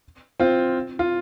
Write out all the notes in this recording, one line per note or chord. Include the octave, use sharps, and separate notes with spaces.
C4 F4
F4